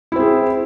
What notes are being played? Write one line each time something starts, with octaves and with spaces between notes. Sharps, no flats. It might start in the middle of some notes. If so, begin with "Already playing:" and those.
C4 E4 G#4